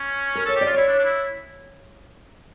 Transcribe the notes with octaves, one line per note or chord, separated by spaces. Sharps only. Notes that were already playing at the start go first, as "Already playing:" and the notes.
Already playing: C#4
A#4
A4 C#5
G4
D5
F4
E4 C#5
D4
D4
E4